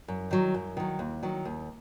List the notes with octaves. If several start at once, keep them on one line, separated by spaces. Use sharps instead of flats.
F#2
D#3 F#3
F#2
D#3 F#3
D#2
D#3 F#3
D#2